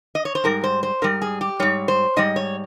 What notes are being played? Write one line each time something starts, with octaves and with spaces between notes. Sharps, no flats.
D#5
C#5
C5
G#2 G3 A#4
C5
C5
G#2 G3 A#4
G#4
G4
G#2 G3 C#5
C5
G#2 G3 D#5
C#5